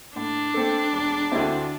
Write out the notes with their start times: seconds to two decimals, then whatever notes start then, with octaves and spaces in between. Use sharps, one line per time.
0.16 A2 D4
0.54 A3 C4 A4
0.93 E1
1.32 D2 D3 C4 E4